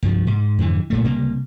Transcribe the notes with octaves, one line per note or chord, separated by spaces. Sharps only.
C2 G2 F3
G#2
F2 G#2 D3 E3
B1 A#2 A3
C#2 C3 G3 A#3